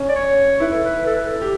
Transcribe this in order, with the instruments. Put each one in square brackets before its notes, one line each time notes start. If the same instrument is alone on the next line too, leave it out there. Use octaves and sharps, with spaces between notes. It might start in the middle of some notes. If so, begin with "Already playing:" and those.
Already playing: [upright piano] C#4
[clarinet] D5
C#5
[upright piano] E4 [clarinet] B4
[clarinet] A4
B4
A4
B4
A4
[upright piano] G4